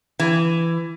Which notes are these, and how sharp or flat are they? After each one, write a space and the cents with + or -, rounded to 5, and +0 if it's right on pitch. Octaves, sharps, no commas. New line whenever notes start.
E3 +15